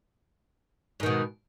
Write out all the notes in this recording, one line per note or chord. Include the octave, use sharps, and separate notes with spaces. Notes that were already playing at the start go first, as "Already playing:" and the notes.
G#2 B2 D#3